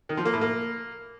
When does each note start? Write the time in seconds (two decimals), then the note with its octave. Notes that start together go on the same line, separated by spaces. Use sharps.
0.09 D#3
0.17 F3
0.25 A#3
0.33 A2
0.41 A#3